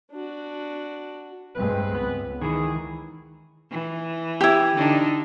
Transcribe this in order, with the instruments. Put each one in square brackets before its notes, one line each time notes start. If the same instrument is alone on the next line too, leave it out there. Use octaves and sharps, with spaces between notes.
[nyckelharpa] D4 F#4
[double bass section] G2 G#3 C4 [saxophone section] B4
[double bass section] C#2 [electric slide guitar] B3
[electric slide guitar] D#3 E3 [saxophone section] G#4
[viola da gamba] E3
[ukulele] E4 G4
[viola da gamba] D3 D4 D#4